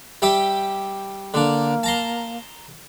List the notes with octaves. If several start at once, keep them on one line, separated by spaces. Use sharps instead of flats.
G3 G4 E5
D3 A#3 D4
A5 A#5 C6